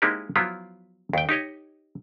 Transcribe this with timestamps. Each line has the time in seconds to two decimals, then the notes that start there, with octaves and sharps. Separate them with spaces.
0.02 G#3 A#3 C4 D#4 E4 G4
0.36 F3 F#3 B3 E4 F4
1.13 D#2 G5
1.29 D#4 G4 C#5 D#5